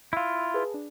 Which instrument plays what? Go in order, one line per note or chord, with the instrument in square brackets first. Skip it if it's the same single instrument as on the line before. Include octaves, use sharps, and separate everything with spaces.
[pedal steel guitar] E4 F4 [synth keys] F5 E6
[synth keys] G#4 B4 A5
D4